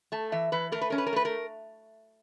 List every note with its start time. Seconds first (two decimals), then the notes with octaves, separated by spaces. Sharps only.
0.12 A3 A5
0.32 E3 E5
0.52 E3 B4
0.72 A3 A#4
0.81 B4
0.90 C#4 A#4
0.98 B4
1.06 A#4
1.13 A3 B4
1.25 A#4